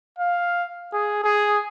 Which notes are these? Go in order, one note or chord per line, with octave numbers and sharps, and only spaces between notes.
F5
G#4
G#4